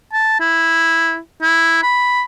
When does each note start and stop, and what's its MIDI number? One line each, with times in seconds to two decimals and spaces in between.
0.13 0.40 81
0.40 1.18 64
1.42 1.80 64
1.83 2.23 83